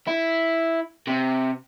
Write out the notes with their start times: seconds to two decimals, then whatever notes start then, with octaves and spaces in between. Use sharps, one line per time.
0.07 E4
1.07 C3